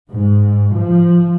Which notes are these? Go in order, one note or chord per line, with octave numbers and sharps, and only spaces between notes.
G#2
F3